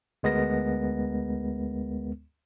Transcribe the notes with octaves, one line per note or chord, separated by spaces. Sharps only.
D2 G#3 B3 A#4 A#6